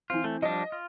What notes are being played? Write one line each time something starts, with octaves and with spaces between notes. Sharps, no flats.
E3 C4 F4
A3
F3 G3 D4 D#5
F4